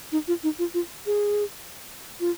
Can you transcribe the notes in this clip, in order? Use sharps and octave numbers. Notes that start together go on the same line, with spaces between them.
D#4
F4
D#4
F4
F4
G#4
F4